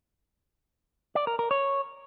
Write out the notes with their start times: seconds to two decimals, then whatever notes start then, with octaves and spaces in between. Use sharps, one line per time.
1.15 D5
1.27 A#4
1.39 A#4
1.51 C#5